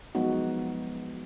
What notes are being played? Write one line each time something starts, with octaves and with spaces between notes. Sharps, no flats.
F3 F#3 G#3 B3 D#4 F#4